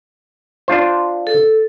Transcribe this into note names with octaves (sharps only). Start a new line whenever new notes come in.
D4 F4 C5
A4